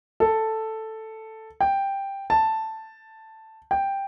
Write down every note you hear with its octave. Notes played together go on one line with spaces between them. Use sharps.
A4
G5
A5
G5